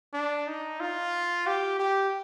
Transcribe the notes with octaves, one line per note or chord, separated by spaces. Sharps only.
D4
D#4
F4
G4
G4